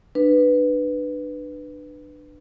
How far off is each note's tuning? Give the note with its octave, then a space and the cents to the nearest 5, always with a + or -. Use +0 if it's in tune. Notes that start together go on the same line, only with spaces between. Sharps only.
D4 +30 B4 +0